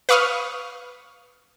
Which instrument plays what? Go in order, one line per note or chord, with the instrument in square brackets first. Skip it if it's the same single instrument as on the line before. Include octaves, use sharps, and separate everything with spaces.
[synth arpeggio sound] B4 F5 C#6 D#6 F6